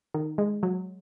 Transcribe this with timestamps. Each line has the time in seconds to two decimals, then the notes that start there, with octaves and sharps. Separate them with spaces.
0.14 D#3
0.38 G#3
0.63 F#3